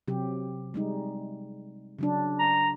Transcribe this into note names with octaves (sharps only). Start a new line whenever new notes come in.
C3 F#3 G4
G3 G#3 D#4
C#3 F#3 D4
A#5